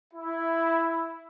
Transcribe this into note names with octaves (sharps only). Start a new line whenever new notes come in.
E4